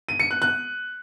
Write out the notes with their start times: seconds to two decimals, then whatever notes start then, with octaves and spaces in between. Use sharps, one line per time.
0.09 D#7
0.20 C#7
0.31 F#6
0.42 F#6